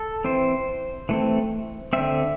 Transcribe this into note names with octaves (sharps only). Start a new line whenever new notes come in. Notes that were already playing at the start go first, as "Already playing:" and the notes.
Already playing: A4
E3 C4 C5
E3 A3 C4
D3 C4 E5